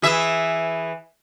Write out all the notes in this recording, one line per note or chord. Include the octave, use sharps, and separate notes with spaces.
E3 G#4 E5